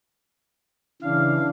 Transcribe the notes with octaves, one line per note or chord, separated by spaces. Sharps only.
C#3 E3 D4 F5